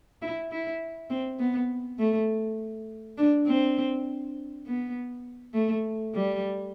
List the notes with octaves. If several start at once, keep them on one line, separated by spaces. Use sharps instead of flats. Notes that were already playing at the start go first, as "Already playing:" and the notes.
E4
E4
C4
B3
A3
D4
C4
B3
A3
G3